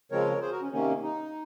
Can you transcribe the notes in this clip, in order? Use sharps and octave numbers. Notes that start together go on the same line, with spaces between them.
C#3 F3 G#3 C4 A#4 C#5
G#4 C5
F#4 A#4
C#4
C3 D#3 A#3 C#4
D#4